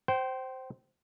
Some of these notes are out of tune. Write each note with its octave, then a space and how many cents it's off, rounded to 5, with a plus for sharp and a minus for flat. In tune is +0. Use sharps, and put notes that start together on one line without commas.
C5 +0 G5 -30